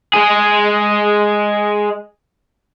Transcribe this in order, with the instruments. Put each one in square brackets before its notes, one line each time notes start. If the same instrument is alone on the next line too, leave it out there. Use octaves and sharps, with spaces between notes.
[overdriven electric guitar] G#3 G#4